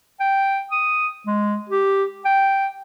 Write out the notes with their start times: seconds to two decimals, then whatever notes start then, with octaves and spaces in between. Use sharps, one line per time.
0.20 G5
0.71 D#6
1.27 G#3
1.69 G4
2.25 G5